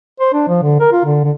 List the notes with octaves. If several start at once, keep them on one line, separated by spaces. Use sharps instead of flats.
C5
D4
F3
D3
A#4
F4
D3
D3